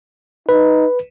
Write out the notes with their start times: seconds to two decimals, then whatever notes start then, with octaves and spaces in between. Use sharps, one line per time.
0.49 D#4 B4